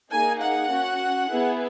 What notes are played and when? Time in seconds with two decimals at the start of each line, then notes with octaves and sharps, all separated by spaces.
0.10 A#3 D#4 G#4 G#5
0.40 F#5
0.71 C#4 F#4
1.30 B3 E4 G#4